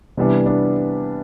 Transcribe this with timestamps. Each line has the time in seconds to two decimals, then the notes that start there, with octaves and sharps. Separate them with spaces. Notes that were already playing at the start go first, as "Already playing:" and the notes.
0.17 C3 E3 G3 B3 D4
0.46 B3 D4